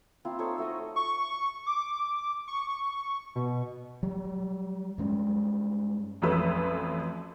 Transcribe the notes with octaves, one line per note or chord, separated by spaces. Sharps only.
A#3 C4 E4 F4
D#4 A4 C5 C#5
A3 F#4 D#5
C#6
D6
C#6
B2
F#3 G3
G2 G#3 C#4
A1 F2 F#3 A3 B4 E6